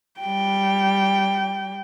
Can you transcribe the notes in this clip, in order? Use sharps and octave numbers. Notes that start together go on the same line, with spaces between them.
G3 G5